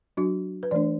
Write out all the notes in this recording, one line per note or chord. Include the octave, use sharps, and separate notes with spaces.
F#3 D4 F#4
B4
E3 A3 D4 D5